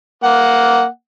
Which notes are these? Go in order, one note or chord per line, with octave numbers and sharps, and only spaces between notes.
A#3 F#5